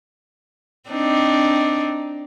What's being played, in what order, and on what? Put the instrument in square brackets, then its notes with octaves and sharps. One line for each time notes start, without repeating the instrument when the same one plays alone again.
[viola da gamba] C4 D4 D#4